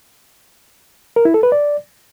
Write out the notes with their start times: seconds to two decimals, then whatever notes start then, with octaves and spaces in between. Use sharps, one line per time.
1.16 A#4
1.25 E4
1.34 A4
1.43 B4
1.52 D5